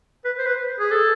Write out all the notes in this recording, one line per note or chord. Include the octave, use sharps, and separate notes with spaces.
B4
C5
B4
G#4
A4